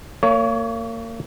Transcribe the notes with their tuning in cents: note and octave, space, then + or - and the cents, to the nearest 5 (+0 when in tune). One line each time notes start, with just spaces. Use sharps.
A#3 -35 C#5 +20